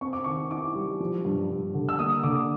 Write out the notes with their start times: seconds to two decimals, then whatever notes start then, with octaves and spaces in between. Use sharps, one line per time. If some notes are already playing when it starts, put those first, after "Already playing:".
0.01 C4 C#6
0.13 D6
0.24 D#3 C#6
0.51 E4 D6
0.75 G3
1.00 F3
1.25 G2
1.50 G2
1.74 D3
1.89 E6
1.99 A#3 D#6
2.24 D3 D6